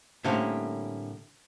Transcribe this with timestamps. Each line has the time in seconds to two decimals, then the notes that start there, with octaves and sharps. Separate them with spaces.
0.24 A2 D3 G3 A#3 C4 C#4